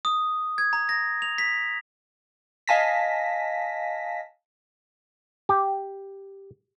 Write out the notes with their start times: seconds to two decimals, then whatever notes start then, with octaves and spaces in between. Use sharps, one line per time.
0.05 D#6
0.58 G#6
0.73 A#5
0.89 A#6
1.22 F7
1.38 B6
2.68 D#5 F5 G#5 A5 A#6 B6
5.49 G4